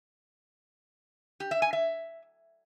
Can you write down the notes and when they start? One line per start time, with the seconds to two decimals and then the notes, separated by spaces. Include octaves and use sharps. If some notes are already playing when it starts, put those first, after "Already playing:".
1.40 G4
1.51 E5
1.62 G#5
1.73 E5